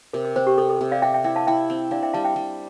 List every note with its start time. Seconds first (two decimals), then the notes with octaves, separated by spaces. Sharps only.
0.13 C3 A#4
0.25 A#4
0.36 C4 C5
0.47 G4
0.58 C3 A4
0.69 A4
0.81 C3
0.92 D5 F5
1.02 G4 E5 G5
1.14 E5 G5
1.24 E4 E5 G5
1.36 F5 A5
1.47 E4 E5 G5
1.70 C4
1.91 D4 D5 F5
2.03 E5 G5
2.13 G3 F5 A5
2.25 E5 G5
2.36 G3